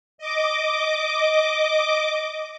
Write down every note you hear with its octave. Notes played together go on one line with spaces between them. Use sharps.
D#5 D6